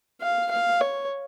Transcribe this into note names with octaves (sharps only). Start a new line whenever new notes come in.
F5
F5
C#5